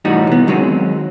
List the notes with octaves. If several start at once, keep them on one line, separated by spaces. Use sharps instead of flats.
C2 A2 E3 G3 D#4 F#4
E3 B3
D#3 F#3 G#3 C4 C#4